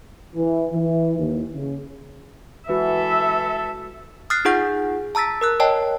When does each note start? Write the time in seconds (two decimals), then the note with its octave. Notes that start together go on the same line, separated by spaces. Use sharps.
0.35 E3
0.71 E3
1.18 D#2
1.55 C#3
2.69 E3 G#3 F#4 A4 E5
4.30 D#6 F6 F#6 A6 C7
4.45 D#4 F4 G#4 F#5 G6
5.15 A5 A#5 E6 A6 B6
5.41 A#4 E6 F#6
5.60 A#4 C#5 D#5 G5 A5